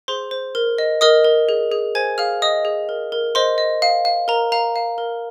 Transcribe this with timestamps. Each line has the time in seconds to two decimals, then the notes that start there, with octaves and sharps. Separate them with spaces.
0.08 G#4 C5 C6
0.31 C5
0.55 A#4
0.78 D#5
1.01 A#4 D#5 D#6
1.24 A#4
1.49 G#4
1.72 G#4
1.95 C5 G#5 G#6
2.18 G#4 F5 F6
2.42 G#4 D#5 D#6
2.65 G#4
2.89 A#4
3.12 A#4
3.35 C5 D#5 C6
3.58 D#5
3.82 F5
4.05 F5
4.28 A#4 A#5
4.52 F5 A#5
4.76 F5
4.98 A#4